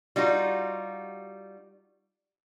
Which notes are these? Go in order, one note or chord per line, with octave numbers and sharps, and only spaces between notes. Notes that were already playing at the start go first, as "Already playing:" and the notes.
G3 D#4 F4 F#4